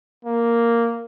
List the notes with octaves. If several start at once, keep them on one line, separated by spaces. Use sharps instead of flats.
A#3